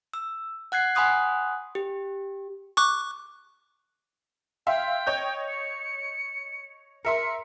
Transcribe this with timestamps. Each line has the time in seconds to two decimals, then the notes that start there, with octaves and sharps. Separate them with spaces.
0.14 E6
0.72 F#5 F#6 G#6 C7
0.95 F#5 G#5 B5 C6 D#6 F#6
1.75 G4
2.77 C#6 D6 F#6
4.67 E5 F5 G5 C6
5.07 C#5 D#5 G6
5.48 C#7
7.05 A#4 E5 C6 C#7